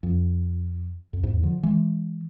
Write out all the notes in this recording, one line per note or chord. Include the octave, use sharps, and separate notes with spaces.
F2
F2
E2 G#2
D3 F3
E3 G#3